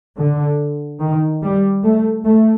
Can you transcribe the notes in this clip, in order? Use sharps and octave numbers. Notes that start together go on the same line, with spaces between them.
D3
D#3
G3
A3
A3